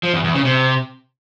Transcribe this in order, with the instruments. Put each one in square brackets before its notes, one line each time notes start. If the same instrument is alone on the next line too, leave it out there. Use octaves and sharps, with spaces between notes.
[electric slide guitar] F3
E2
E2
C#3
C3